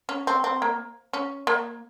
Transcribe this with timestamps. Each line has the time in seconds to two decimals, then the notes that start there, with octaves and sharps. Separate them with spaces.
0.09 C#4
0.27 C4
0.44 C4
0.62 A#3
1.13 C#4
1.47 A#3